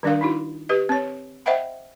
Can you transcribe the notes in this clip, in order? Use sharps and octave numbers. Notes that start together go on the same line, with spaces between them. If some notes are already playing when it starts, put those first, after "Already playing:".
D#3 G3 D4 A#4 F5
D#4 E4 F#4
G4 B4 D#5
C4 C#5
C5 D#5 E5 F#5 G5 B5